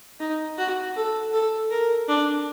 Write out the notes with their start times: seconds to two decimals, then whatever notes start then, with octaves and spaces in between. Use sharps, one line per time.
0.20 D#4
0.58 F#4
0.96 A4
1.33 A4
1.71 A#4
2.08 D4